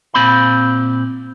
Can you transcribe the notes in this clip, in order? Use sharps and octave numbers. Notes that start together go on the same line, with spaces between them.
A#2 C4 B5